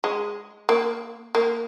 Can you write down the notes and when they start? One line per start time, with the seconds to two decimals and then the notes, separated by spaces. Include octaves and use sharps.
0.04 G#3
0.69 A#3
1.35 A#3